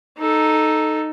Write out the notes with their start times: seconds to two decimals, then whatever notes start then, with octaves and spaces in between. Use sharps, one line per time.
0.18 D#4 A4